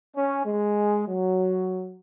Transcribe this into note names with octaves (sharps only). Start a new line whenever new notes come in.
C#4
G#3
F#3